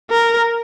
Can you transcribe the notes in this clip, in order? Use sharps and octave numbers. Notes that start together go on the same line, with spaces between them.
A#4